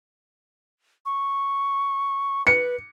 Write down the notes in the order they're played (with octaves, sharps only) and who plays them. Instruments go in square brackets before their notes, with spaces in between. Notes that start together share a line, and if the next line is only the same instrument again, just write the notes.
[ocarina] C#6
[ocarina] B4 [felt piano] C#7